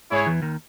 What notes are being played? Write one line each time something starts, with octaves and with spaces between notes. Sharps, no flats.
G#2 E4 G#4 C#5
E2 E3
D#2 D#3